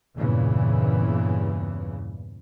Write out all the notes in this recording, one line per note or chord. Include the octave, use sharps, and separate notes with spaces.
E2 G2 A#2 C#3 E3